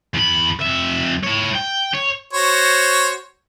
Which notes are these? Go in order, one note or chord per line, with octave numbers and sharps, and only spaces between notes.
E2 B5
F2 E5
E4 C#5
G5
C#5
F#4 C5 C#5